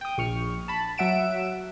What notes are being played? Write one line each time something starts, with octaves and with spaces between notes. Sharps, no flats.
G5 D#6
A#1 C#6 F6
A5 B5
F#3 E5 F#5 D7 E7